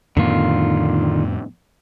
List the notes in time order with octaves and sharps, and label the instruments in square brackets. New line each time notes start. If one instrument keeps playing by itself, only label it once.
[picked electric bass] F2 A2 B3 [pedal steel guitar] D3 D#3 F4